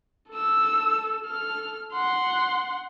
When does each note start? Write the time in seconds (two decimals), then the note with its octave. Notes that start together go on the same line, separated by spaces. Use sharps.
0.30 A4 E6
1.25 A4 F6
1.93 F#5 C6